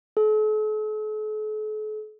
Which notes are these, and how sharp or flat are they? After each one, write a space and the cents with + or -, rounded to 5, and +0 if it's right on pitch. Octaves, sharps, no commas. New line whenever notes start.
A4 -45